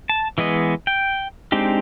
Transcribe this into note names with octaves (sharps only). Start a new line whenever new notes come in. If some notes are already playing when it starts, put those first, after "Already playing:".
A5
E3 G#3 B3 D#5
G5
G#3 C4 D4 D#4 G4